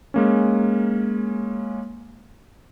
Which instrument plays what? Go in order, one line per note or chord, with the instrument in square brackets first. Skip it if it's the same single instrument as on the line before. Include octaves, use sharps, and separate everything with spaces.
[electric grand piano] G#3 A#3 C#4